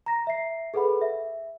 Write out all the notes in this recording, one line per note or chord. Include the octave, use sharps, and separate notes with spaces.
A#5 A#6
E5 C7
G#4 A4 B4 F#5 B5
E5